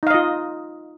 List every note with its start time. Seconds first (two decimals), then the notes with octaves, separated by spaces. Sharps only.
0.03 D#4
0.07 F5
0.11 D#5
0.14 F4